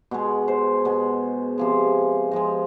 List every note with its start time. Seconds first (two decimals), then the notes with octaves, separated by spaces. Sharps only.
0.11 B2 G#3
0.48 C5
0.85 B2 G#3
1.58 C3 F3 G#3
2.31 C3 F3 G#3 D#5